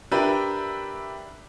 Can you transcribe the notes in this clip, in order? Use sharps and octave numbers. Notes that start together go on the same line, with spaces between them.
D4 G4 A#4 B4 E5 G5